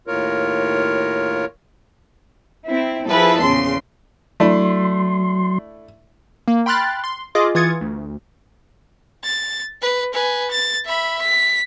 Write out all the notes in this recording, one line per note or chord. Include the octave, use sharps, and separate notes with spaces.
D#2 A2 F4 A#4 C#5
C4 E4
F3 E4 G#4 A4 B4
A#1 E2 C#3 C6
F#3 A3 D4 E4 C6
A#3
G5 B5 C6 F6 F#6 A6
C6
F4 G#4 D#5 D6
E3 F4 D#6 G#6 A6 C#7
D2
A6
B4
B4 G#5
A6
E5 B5
B6